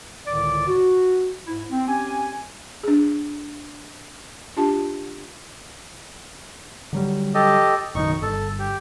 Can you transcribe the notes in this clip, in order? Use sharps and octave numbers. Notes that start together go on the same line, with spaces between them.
C#2 A2 D3 D#3 D5
F#4
G#2 E4
C4
C4 C#4 G4 G#5
D4 G#4
D4 F4 G4 A5
D3 F#3 G3
G4 A4 D#5
F#1 B1 D#3 D#4 C#6
G1 A4
G4